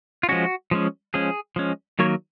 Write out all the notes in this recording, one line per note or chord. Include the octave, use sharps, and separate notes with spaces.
F4
F3 G#3 C#4 F#4
F3 G#3 C#4
F3 G#3 C#4 G#4
F3 G#3 C#4
D#3 F#3 A#3 C#5